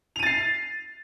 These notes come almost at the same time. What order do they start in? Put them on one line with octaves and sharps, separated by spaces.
F7 D#7 A6 C7